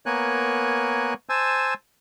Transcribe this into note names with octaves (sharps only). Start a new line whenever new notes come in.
A#3 B3 A#4 C#5 G#5 F#6
C5 G#5 A5 E6